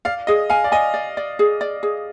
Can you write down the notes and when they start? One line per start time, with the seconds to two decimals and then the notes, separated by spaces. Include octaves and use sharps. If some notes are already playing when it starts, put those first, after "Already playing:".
0.05 D5 F5
0.27 G#4 D#5
0.50 F5 G#5
0.64 D5
0.72 D#5 G#5
0.94 D5
1.17 D5
1.39 G#4
1.61 D5
1.83 G#4